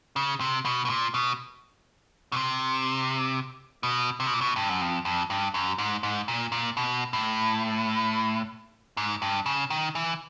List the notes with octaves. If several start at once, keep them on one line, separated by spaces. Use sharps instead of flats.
C#3
C3
B2
B2
A#2
B2
B2
C3
B2
C3
B2
A#2
B2
G2
F#2
F2
F2
G2
F#2
G#2
G#2
A#2
A#2
B2
A2
G#2
G2
C#3
D#3
E3